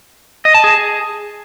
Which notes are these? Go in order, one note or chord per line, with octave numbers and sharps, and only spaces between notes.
D#5
A5
G#4